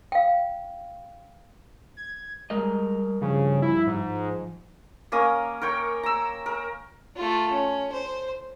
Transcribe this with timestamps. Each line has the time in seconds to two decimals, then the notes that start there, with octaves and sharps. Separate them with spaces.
0.12 F5 G5
1.97 G#6
2.50 G3 G#3 A#4 D#5
3.22 G2 C#3 F3
3.62 E4
3.87 G#2
5.12 A#3 C#4 A#4 D#6
5.61 A#4 C#5 G5 C#6
6.03 A#5 E6
6.46 A#4
7.16 A3 F4
7.51 C#4
7.92 C5